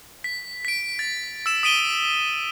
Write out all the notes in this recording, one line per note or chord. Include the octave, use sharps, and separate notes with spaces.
B6
B6 D7
A6
E6 E7
D#6 B6 D7 D#7 G7